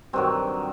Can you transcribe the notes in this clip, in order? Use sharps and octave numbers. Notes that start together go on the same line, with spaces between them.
G2 D#3 F#3 C4